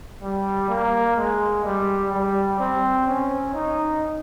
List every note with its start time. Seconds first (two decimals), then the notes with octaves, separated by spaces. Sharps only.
0.22 G3
0.69 A#3
1.17 G#3
1.64 G3
2.12 G3
2.59 C4
3.07 C#4
3.54 D#4